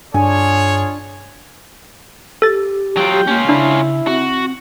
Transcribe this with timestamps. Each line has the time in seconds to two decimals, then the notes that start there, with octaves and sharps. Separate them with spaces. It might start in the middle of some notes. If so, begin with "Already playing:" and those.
0.14 G2 D4 F4 G#4 C#5 G#5
2.42 G4 A4 A6
2.97 F#3 F4 G5
3.28 A#3 C#4 F4
3.49 C#3 D4 E4
4.07 C4 F#4